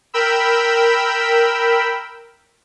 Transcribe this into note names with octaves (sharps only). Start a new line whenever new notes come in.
A#4 G5 B5 E6